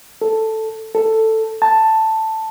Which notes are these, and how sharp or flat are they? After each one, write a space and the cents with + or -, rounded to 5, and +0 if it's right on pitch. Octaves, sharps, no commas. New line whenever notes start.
A4 +5
A4 +10
A5 +5